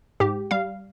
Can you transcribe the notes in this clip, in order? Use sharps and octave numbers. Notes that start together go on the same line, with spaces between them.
G#2 G4
G3 F5